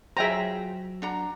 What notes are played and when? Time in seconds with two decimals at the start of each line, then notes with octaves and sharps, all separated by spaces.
0.17 F#3 F4 G#4 C5 E5 G5 A#5
1.02 D4 F#5 A#5